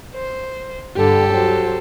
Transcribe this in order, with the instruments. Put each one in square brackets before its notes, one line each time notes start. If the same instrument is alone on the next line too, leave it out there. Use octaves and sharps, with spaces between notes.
[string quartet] C5
[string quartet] G2 D3 G3 [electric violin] G4 A4
[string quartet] F#3 C5